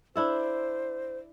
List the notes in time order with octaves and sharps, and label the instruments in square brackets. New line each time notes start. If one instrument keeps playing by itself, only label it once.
[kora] D4 E4 A4 [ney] C5